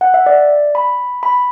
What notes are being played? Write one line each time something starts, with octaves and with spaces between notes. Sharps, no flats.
F#5
E5
D5
B5
B5